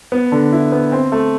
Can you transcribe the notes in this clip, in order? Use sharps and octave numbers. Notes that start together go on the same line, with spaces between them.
B3
D3
E4
B3
C4
A3